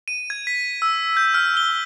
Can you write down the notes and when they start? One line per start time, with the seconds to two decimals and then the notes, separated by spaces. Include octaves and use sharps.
0.08 D#7
0.30 G#6
0.47 B6
0.82 E6
1.17 G6
1.34 F6
1.57 G7